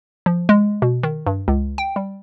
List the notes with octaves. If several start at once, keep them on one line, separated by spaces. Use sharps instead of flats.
F3
G#3
B2
D#3
G2
C#2
G5
G3